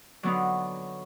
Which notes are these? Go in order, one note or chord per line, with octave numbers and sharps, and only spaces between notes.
D3 F#3 B3 D#4